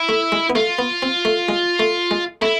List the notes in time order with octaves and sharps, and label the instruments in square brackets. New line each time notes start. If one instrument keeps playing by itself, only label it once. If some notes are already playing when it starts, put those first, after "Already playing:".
Already playing: [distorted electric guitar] E4
[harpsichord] A3
G#3
B3
[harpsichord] A3 [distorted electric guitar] F4
[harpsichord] B3
C4
A3
G#3
A3
G#3
[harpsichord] A3 [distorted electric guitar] E4